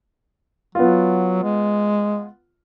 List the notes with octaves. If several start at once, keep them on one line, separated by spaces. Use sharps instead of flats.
F#3 B3 F4
G#3